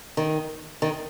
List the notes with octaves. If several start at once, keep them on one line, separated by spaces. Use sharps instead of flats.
D#3
D#3